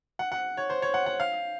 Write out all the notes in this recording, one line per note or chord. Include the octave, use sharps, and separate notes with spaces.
F#5
F#5
C#5
C5
C#5
F#5
F#5
F5